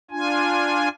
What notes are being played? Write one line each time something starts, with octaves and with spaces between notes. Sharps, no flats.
D4 F4 G#5